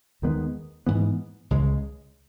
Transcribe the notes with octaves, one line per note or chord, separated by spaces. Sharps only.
D#2 D#3 G#3 B3
G#2 E3 B3
C#2 C#3 G#3